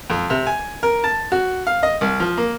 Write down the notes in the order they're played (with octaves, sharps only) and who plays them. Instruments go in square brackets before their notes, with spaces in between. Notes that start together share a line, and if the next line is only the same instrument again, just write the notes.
[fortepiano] F2
C3
G#5
A#4
A5
F#4
F5
D#5
C2
F3
A#3